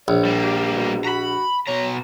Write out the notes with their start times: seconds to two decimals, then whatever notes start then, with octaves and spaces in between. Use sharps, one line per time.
0.08 A#1 C#5
0.25 G3 A#3
0.43 G4
0.76 B2
1.05 F#4 A#5 B5
1.67 B2 C#5 A#5